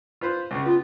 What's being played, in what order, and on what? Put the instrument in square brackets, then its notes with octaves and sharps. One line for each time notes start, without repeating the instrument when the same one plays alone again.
[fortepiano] F4 B4 C5
C#2 C#3
[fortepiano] B3 [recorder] F4